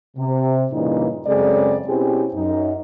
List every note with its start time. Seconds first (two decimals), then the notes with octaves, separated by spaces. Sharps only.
0.17 C3
0.72 G2 A#2 C#3 E3 D#4
1.27 F#2 C#3 G#3 C4 A4 D5
1.87 B2 C4 C#4 E4 G4 G#4
2.34 F#2 D#4